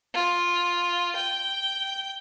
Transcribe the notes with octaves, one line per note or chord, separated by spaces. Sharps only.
F4
G5